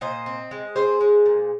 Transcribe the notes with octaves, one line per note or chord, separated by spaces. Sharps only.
A#2 C5 D#5
C4
G#3
C4 G#4 C5
G#3
A#2